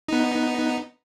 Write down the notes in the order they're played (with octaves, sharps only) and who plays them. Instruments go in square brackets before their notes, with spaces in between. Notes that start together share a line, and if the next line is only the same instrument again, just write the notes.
[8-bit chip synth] B3 D#4